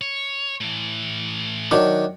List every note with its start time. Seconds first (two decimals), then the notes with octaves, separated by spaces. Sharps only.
0.01 C#5
0.61 A2 E3
1.71 D#3 F#3 D4